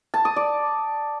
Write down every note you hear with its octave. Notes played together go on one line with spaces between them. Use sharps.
A5
D#6
D5